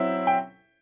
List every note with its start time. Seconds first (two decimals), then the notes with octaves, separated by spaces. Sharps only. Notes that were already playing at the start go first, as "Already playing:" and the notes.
Already playing: F#3 C4 E4 E5
0.27 G5